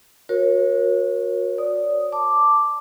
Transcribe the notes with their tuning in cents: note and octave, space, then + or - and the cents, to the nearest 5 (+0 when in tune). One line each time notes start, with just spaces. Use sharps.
F#4 -30 A#4 +20 C#5 -25
D5 -10 D#6 +0
A5 +5 D6 +0